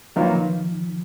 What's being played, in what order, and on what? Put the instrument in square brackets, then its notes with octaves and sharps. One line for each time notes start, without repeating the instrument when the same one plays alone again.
[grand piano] D#3 F#3 A#3 F4 B4 [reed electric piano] F3
[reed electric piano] D#3